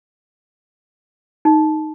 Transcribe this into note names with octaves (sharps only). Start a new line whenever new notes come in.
D#4